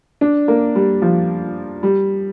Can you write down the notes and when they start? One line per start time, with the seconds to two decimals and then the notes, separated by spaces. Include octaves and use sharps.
0.21 D4
0.48 A#3
0.75 G3
1.02 F3
1.83 G3